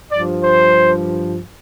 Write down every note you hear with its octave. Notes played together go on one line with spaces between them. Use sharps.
G2 F3 D5
C5